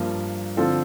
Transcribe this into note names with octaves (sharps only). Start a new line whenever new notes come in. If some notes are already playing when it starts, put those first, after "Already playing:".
Already playing: G2 F3 A#3
D3 F3 C4 F4 A4